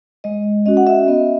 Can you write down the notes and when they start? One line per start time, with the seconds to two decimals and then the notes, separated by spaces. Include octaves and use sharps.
0.24 G#3 D#5
0.66 C#4 F#4 D#5
0.77 F#5
0.87 E5
1.07 B3 D#5